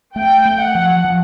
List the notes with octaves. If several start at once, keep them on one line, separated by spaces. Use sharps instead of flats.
A3 G5
A3
F#5
F3
F3